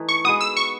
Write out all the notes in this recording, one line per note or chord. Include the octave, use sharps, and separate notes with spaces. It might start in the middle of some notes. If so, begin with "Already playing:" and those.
Already playing: E3 A3 D#4
C#6
G#3 B3 F#4 D#6
E6
C#6